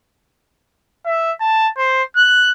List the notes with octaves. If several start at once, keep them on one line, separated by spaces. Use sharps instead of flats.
E5
A5
C5
F#6